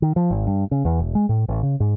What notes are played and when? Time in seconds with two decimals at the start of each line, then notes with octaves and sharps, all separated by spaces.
0.02 D#3
0.16 F3
0.31 G#1
0.47 G2
0.71 C#3
0.85 E2
0.99 E1
1.15 G#3
1.29 A2
1.48 A1
1.63 C#3
1.80 G#2